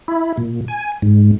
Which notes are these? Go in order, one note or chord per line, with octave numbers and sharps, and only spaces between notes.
E4
A#2
G#5
G#2